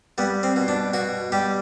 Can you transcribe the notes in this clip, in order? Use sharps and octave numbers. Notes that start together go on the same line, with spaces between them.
G3 B3
C4
B2
D4
B2 F#4
G3 G4